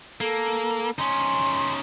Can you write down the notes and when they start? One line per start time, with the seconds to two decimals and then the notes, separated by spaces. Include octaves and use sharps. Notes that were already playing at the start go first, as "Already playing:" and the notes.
0.21 A#3 A4
0.98 C#4 D#4 C6